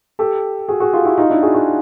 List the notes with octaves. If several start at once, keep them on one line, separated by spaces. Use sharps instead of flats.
G4 A4
F#4 G#4
F#4 G#4
F4 G4
E4 F#4
D#4 F4
D4 E4
F#4 G#4
F#4 G#4